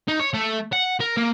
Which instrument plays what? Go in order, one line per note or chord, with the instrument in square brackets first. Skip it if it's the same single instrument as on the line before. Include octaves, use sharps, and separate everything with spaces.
[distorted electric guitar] D#4
C#5
A3
F#5
A#4
A#3